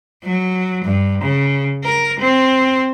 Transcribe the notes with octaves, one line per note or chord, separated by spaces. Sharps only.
F#3
G2
C#3
A#4
C4